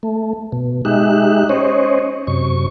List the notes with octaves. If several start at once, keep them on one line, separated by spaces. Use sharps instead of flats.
A3
B2
G#3 D#4 G4 E5 F#6
C#4 C5 C#5 D#5
F#2 C3 C#6